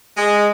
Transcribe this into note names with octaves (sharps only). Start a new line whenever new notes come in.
G#3